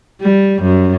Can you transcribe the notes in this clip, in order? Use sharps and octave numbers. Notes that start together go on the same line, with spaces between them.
G3
F#2